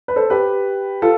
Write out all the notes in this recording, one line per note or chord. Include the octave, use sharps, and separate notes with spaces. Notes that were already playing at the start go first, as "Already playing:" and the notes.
B4
A4 C5
G4 B4
F4 A4